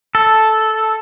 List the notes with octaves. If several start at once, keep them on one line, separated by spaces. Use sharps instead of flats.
A4